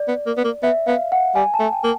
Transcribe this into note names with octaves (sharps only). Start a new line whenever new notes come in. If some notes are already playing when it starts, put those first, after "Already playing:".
Already playing: D5
B3
A#3
B3
A#3
B3 E5
B3 F5
F#5
G3 G#5
A5
A3
G5
A#3